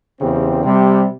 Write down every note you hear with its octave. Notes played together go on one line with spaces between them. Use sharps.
E2 C#3 C4 G4
C3 G3